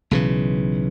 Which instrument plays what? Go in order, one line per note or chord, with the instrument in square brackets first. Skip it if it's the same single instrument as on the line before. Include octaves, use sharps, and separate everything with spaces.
[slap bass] B1 C#3 E3